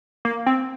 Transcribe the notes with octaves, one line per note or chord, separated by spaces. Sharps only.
A#3
C4